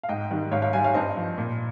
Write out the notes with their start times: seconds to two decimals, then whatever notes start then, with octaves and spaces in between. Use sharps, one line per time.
0.03 F5
0.09 G#2 D#5 G5
0.30 D#3 G3
0.52 G#2 C#5 F5
0.62 C#5 F5
0.73 G3 F5 G#5
0.84 C#5 F5
0.94 G2 C5 D#5
1.17 F3
1.38 A#2